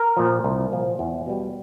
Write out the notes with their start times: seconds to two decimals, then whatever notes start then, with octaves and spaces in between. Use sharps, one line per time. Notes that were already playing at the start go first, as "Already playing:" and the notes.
Already playing: A#4
0.17 A#2 F3
0.44 C2
0.72 A#2 F3
0.99 E2
1.26 B2 G3